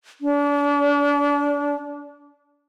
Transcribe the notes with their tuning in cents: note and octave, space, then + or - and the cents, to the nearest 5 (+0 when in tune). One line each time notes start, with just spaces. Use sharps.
D4 -35